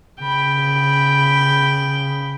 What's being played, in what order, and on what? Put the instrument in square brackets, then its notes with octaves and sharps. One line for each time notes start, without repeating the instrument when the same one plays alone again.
[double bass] C#3 [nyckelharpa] G5 B5